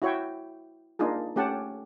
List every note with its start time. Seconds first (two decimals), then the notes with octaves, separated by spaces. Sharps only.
0.02 E4 F#4 C#5 E5 G5
0.99 A#3 D4 D#4 F4 G#4
1.36 A3 C#4 G4 F#5 A5